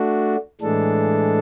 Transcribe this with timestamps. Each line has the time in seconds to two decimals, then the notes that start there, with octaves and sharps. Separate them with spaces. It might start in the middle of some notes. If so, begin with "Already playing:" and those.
Already playing: A3 D4 F#4
0.61 A2 E3 G#3 D4 A4